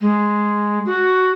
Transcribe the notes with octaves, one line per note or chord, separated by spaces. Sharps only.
G#3
F#4